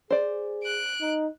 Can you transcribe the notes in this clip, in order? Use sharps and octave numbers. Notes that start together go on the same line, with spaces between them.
G#4 C5 D5
F#6 D7
D#4